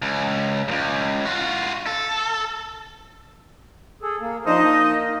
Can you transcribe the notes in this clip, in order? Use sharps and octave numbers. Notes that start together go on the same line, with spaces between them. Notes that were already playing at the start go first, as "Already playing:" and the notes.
C#2
C#2 G2
F4 F#4
A4
G#4 A4
A#3
F3 D4 D#4 C5 D#5
A#3